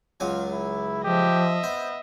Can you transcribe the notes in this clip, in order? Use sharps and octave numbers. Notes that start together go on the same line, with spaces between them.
C#2 F#3 F4 G#5
E4
F3 G4 D#5 E5
B3 C5